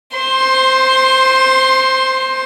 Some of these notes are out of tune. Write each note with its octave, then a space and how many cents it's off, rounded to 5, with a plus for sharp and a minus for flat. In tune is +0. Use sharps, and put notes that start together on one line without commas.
C5 +0 C6 +20